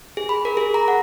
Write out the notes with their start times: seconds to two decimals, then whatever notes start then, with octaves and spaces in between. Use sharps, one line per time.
0.17 G#4
0.29 B5
0.45 A#4
0.57 G#4
0.74 A#5
0.88 F#5